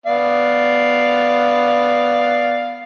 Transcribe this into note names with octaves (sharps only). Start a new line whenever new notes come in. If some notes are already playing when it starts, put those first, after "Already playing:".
B3 D5 F5